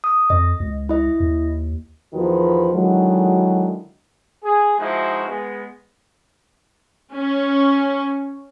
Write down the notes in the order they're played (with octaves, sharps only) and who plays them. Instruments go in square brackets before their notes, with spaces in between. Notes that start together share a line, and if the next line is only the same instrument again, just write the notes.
[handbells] D#6
[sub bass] F2 [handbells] D#5
[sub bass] C#2
[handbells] E4 D#5
[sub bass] D#2
[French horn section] E2 D#3 F3 F#4 B4
D3 D#3 F#3 G#3 E4
[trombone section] G#4
F3 G#3 D#4 E4 F#4
G#3 B3
[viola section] C#4